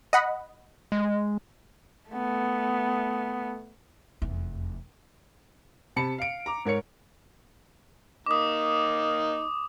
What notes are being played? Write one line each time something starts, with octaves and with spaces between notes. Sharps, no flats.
D#5 F#5 B5
G#3
A3 B3
F1 E2
C3 A5 B5 C#7
F5 D7
A#5 D6
G#2 A#4 C#5 C#7
A#3 D#4 D6 D#6